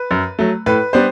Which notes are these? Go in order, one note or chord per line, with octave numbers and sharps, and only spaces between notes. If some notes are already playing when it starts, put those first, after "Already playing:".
Already playing: B4
F#2
F#3 A3
A2 B4
G3 B3 D4 C5